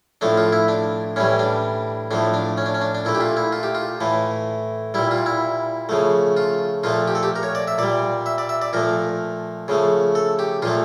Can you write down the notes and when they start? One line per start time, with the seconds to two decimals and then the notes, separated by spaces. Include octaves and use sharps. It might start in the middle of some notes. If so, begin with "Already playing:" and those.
0.21 A2 F3 A3 D4
0.37 F4
0.52 E4
0.68 D4
1.16 A2 E3 G3 C#4
1.39 D4
2.11 A2 F3 A3 D4
2.34 D4
2.57 C#4
2.66 D4
2.74 C#4
2.81 D4
2.95 D4
3.05 A#2 A3 E4
3.15 G4
3.21 F4
3.37 E4
3.52 F4
3.63 G4
3.75 F4
4.01 A2 E3 A3
4.94 A#2 G3 E4
5.11 F4
5.26 E4
5.89 C#3 F3 A3
6.37 F4
6.83 A#2 F3 A3 F4
7.08 G4
7.15 A4
7.23 G4
7.36 A#4
7.43 C#5
7.55 D5
7.68 E5
7.78 A#2 G3 D5
8.26 E5
8.38 D5
8.49 E5
8.62 D5
8.73 A#2 F3 A3 A#4
9.68 C#3 F3 A3
10.15 A4
10.39 G4
10.62 A#2 F3 A3 F4